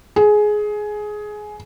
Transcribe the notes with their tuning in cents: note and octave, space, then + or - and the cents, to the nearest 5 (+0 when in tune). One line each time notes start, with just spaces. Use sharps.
G#4 +15